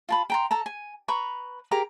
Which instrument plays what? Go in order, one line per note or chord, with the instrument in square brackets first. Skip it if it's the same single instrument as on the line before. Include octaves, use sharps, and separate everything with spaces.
[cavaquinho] F4 A5 B5
G5 A#5 C6
A4 A5 A#5
G#5
B4 A#5 B5 C#6
G4 G#4 A#4 A#5